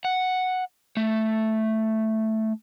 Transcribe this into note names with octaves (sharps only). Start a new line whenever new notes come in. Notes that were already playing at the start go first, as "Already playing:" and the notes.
F#5
A3